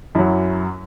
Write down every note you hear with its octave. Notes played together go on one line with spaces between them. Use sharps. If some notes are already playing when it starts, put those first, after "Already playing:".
F#2 F#3 E4